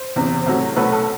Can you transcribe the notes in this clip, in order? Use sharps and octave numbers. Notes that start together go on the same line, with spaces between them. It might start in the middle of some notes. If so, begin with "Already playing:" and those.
Already playing: C5
F#1 E2 C3
C2 C3 F#3 A3
B1 B2 F#3 A3 B4
A4